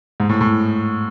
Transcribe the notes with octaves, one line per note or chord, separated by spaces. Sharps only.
G#2
A2
A2